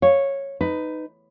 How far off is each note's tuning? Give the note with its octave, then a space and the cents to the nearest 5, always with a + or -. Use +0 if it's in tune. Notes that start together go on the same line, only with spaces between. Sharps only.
C#5 -10 F5 +0
D#4 +0 B4 +15